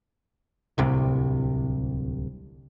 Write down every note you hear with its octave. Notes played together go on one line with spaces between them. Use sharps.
D1 C2 C3